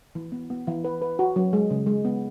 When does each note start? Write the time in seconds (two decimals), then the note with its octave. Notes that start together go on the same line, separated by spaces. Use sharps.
0.15 E3
0.32 B3
0.50 B3
0.67 E3
0.84 B4
1.02 B4
1.19 F#4
1.36 F#3
1.53 G#3
1.70 C#3
1.86 G#3
2.05 B3